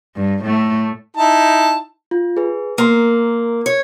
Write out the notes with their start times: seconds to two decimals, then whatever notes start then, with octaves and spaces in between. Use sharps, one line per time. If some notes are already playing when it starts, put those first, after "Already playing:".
0.16 G2
0.45 A2 A3
1.17 D#4 E4 A5
2.11 F4
2.37 G#4 B4
2.78 A#3 A#4 C6
3.66 C#5